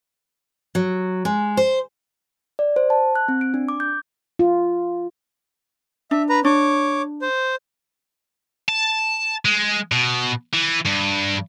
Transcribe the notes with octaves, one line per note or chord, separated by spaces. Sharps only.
F#3
G#3
C5
D5
C5
A5
F#6
C4
D7
D4
D6
G6
F4
D4 E5
B4 A#5
D4 C#5 D6
C5
A5
G#3
B2
E3
G2